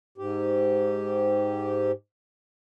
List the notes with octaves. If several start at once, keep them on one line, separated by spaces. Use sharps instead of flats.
G#2 G4